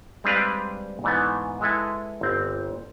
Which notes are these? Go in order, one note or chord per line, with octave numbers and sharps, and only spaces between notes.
G3 G#3 C4 D4 B4 F5
G#2 E3 A3 B3
G#3 E4 A4 B4
G1 C4